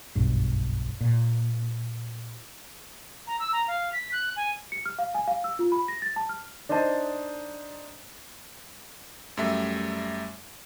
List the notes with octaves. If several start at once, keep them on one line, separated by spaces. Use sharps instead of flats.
F#1 B1 G2
A#2
A#5
E6
A#5
F5
B6
F#6
G#5
C#7
F6
F5
G#5
F5
E6
F4
B5
A#6
A6
A5
F6
D4 D#4 C5 D#5 A5
F#2 G3 A3 E5